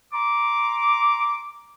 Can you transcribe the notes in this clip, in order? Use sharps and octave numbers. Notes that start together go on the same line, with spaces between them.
A#5 C6 D6